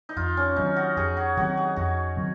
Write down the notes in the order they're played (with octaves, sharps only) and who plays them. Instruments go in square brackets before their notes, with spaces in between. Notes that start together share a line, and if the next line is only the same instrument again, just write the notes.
[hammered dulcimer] D#4
[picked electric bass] F2 [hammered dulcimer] F4
[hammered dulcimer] C#4
[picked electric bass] D#3 F#3 C4 [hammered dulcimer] D#4
[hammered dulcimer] F#4
[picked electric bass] F2 [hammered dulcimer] G#4
[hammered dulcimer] F#4
[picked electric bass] D#3 F#3 C4 [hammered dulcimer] F#4
[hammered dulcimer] G#4
[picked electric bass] F2 [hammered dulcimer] F#4
[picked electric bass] D#3 F#3 C4